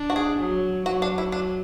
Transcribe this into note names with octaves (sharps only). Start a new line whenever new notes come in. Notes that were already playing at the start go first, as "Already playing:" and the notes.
Already playing: D4
F#4
G#4
F#3
F#3 F#4
D4
E4
D4